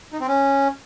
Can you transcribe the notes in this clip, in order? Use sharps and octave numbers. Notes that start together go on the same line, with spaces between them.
D#4
C4
C#4